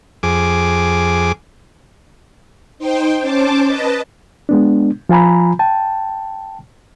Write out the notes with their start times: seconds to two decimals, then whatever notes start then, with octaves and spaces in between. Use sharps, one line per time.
0.23 F2 G#4 D6
2.78 D#4 C5 G5
3.21 C#4 C5 A5 D6
3.67 B4 D#5 A5
4.49 G#3 B3 D4
5.09 F3 F4 G#5 A#5 B5
5.59 G5 A5